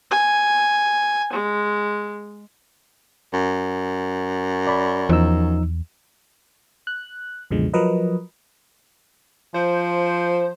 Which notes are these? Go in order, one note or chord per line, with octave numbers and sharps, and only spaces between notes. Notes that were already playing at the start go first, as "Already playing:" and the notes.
G#5
G#3
F#2
D5 B5
E2 F3 D#4 E6
F#6
C#2 F#2 B2 D3 F3 G#3
F3 F#3 A#4 B4 D#5
F3 C5